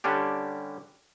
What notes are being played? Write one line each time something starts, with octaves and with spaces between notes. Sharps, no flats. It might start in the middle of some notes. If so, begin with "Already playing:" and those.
D3 G3 C#4 D4 G4